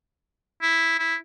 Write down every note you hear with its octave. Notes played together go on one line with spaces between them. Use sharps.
E4
E4